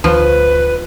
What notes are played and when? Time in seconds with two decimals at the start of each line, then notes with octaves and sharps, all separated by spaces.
0.04 D2 F3 B4